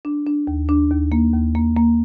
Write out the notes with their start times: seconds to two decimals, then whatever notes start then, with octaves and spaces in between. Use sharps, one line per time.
0.05 D4
0.27 D4
0.47 D#2
0.69 D4
0.91 D#2
1.12 A#3
1.34 D#2
1.55 A#3
1.77 A#3